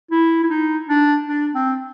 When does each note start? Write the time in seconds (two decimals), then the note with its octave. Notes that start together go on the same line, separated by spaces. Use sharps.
0.11 E4
0.43 E4
0.50 D#4
0.89 D4
1.28 D4
1.55 C4